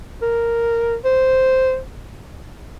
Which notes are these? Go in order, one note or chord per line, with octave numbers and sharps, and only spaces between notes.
A#4
C5